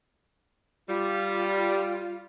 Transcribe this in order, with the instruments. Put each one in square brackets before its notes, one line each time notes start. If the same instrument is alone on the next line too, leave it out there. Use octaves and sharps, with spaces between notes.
[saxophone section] G3 [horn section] F4